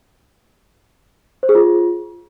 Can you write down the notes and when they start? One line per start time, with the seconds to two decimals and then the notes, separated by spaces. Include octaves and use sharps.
1.43 C5
1.49 G#4
1.55 F4